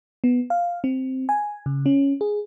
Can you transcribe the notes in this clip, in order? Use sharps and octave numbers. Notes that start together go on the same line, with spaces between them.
B3
F5
C4
G#5
C#3
C#4
G#4